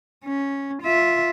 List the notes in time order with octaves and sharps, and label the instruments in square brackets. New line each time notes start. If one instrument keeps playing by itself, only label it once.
[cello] C#4
F4 E5